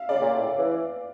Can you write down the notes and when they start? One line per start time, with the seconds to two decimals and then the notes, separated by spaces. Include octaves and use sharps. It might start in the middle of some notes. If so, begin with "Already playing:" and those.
Already playing: E5 F5
0.09 C#3 D5
0.21 A#2
0.34 A2
0.46 C#3
0.58 E3